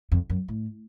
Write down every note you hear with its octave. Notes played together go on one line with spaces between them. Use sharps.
F2
F#2
A2